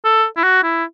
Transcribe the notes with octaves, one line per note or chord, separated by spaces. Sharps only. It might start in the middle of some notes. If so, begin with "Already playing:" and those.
A4
E4
F#4
E4